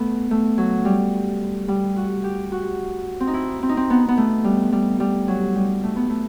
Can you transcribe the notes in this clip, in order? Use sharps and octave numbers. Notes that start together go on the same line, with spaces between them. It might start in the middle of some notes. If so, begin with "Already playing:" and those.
Already playing: A3 B3
A3
F#3
G3
G3
F#4
G4
F#4
C4
D#4
E4
C4
D#4
C4
B3
B3
A3
G3
G3
G3
F#3
G3
A3
B3
A3